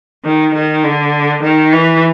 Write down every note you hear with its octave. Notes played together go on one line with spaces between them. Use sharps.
D#3
D#3
D3
D#3
E3